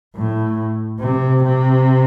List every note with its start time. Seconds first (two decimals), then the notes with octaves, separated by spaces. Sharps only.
0.15 A2
1.00 C3
1.43 C3